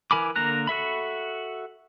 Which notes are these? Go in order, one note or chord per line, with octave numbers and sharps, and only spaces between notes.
E3 A#4 G#5 B5 D6
D3 A#3 A#4 A#5 F#6
F#4 A4 E5 B5